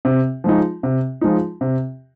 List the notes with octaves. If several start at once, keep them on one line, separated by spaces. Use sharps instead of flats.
C3
F3 G#3 D#4
C3
F3 G#3 D#4
C3